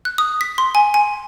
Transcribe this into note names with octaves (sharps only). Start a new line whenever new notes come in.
F#6
D#6
B6
C6
G#5
G#5